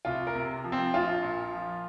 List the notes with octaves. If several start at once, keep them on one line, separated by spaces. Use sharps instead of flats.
C2 F4
A#4
C3
F3
C4
A#1 F4
A#2
F3